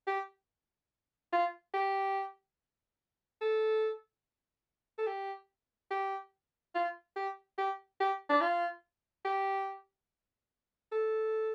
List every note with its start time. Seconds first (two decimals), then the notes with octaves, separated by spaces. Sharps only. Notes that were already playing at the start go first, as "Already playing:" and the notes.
0.07 G4
1.33 F4
1.74 G4
3.41 A4
4.98 A4
5.07 G4
5.91 G4
6.75 F4
7.16 G4
7.58 G4
8.00 G4
8.29 D4
8.41 F4
9.25 G4
10.92 A4